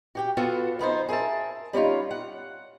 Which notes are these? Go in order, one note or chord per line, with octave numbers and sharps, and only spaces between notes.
F#4 G4 G5
B3 F4 F#4 A4
F2 B3 D#4 C5
G#4 A#4 D5 E5 A5
G3 C#4 D#4 F4
F#5